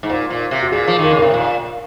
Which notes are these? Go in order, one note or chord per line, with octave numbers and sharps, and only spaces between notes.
G#2
A#2 C5
A#2
C3
F#4
A#2 G#4
F3
D#3 A#4
C#3
C3 A#4
A#2 A#4